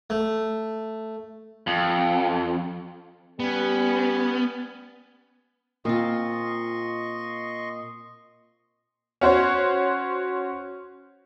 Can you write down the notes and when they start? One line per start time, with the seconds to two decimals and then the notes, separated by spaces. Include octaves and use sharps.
0.10 A3
1.67 F2
3.40 G3 B3 C#4
5.85 A#2 C4 F4 D#5 C6 C#6
9.21 C#4 F#4 C5 C#5